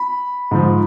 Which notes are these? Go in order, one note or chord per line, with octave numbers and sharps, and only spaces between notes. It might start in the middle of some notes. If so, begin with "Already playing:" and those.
Already playing: B5
G#2 F3